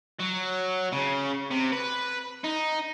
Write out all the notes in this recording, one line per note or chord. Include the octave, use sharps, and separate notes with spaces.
F#3
C#3
C3
B4
D#4